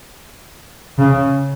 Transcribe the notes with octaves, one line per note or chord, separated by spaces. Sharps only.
C#3